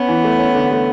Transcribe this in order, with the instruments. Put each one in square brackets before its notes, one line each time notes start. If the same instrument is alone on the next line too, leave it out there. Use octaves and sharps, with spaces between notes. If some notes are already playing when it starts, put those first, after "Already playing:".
Already playing: [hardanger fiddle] B3 [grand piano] C#4
[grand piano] E3
A3
C#4
D3
A3